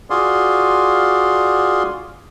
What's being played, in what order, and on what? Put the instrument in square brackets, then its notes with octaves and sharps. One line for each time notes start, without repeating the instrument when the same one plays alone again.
[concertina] F4 F#4 G#4 D5 C6